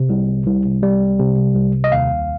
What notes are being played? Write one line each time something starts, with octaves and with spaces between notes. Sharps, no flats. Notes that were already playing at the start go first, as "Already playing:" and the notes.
Already playing: C3
C2
C2
G3
C3
C2
D#5
D#2 F5